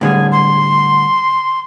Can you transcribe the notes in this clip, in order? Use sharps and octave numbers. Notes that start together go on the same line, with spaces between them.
A2 D3 G3 G#4
C6